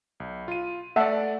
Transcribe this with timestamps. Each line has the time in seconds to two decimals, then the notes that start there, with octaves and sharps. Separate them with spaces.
0.20 B1
0.48 F4 D#7
0.96 A3 D5 E5 F#5 A5